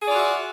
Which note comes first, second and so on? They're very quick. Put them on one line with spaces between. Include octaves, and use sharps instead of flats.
G#4 D5 F4 F#4 E5